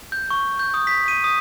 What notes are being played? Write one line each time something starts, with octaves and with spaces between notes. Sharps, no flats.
G6
C#6
G6
D#6
B6
D#7
D#6